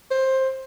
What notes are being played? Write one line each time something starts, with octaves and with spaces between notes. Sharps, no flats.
C5